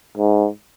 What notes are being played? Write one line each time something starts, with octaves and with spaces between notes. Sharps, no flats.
G#2